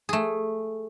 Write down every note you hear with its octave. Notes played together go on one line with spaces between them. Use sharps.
A3 G#4